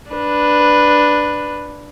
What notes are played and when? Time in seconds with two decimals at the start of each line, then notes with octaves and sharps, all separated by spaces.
0.11 D4 B4